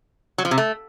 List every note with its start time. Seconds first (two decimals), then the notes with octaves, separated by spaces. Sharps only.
0.38 F#3
0.45 F3
0.51 C3
0.58 A3